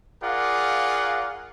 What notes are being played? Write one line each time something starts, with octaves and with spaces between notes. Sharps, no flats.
F4 G#4 A#4 D5 F5 F#5